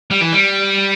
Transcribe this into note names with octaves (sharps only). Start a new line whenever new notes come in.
G3
E3
G3